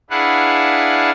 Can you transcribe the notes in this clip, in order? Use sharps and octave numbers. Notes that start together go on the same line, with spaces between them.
D4 E4 G#4 B4 F5 F#5